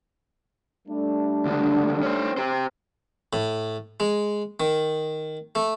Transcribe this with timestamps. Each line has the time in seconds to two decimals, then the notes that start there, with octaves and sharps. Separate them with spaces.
0.87 G3 A3 D4
1.46 C#2 D3
2.02 C#4 C5
2.37 G4 C5
3.33 A2
4.00 G#3
4.60 D#3
5.55 A3